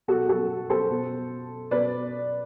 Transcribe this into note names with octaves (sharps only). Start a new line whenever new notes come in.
B2 F#4 A4
F#4 A4
A4 C5
B2
B2 B4 D5